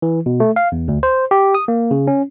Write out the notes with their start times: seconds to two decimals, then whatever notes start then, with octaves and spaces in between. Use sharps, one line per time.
0.02 E3
0.26 B2
0.40 A3
0.56 F5
0.72 E2
0.88 D2
1.03 C5
1.31 G4
1.54 D#6
1.68 A#3
1.91 C#3
2.07 C#4